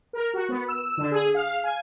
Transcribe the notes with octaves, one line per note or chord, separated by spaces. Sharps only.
A#4
F#4
B3
E6
D3
G#4
F5
G#5